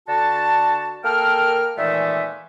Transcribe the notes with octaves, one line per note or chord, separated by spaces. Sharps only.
D3 F#4 A5
A#3 A4 A#4 G5 F6
A#2 D#3 E3 G#3 A3 E5